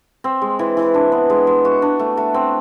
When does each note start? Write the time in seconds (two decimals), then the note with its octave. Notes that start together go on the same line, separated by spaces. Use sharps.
0.24 C4
0.42 G#3
0.59 E3
0.77 E3
0.94 D4
1.12 B3
1.30 G#3
1.47 G#3
1.65 F#4
1.82 D4
1.99 A3
2.17 A3
2.34 C4